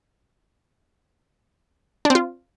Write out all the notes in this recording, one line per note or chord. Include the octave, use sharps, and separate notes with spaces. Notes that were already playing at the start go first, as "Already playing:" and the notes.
D4
C4
F4